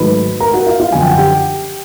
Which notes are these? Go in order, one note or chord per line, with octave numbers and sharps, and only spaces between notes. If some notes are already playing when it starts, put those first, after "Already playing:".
Already playing: G#2 D#3 F#3 A3 B4 B5
A#4 A#5
F#4 F#5
F4 F5
F4 F5
F#2 D3 F3 G#5
G5
F#5
G4 G5